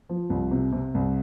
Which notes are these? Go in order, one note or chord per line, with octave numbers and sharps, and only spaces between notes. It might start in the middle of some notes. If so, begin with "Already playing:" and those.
F3
C2
C3
C3
C2